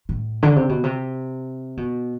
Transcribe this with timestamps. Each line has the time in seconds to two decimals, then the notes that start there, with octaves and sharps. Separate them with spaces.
0.09 A2
0.43 D3
0.56 C3
0.69 B2
0.84 C3
1.77 B2